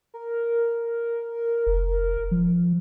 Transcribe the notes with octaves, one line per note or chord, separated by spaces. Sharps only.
A#4
F1
F3